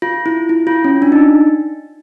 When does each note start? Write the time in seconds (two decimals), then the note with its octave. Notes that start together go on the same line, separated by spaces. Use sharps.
0.02 F4
0.26 E4
0.49 E4
0.67 F4
0.85 C#4
1.02 D4
1.12 D#4